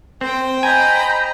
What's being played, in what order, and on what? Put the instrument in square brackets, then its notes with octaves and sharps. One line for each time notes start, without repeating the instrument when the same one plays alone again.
[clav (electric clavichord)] C4 [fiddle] C5 G5
[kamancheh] D#5 A#5 [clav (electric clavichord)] G#5 [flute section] B5 G6